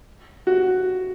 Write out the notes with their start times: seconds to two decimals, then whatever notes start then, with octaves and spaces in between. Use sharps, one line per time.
0.47 F#4